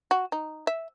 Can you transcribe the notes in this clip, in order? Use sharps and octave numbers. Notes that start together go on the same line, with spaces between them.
F#4
D#4
E5